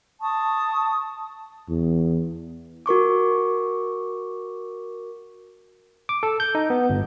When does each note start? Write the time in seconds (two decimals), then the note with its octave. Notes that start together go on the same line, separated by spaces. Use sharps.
0.22 A5 C#6 D#6
1.69 E2
2.86 F#4 A#4 C#6 D6
6.09 D6
6.23 A4
6.40 G6
6.55 D#4
6.70 B3
6.90 G1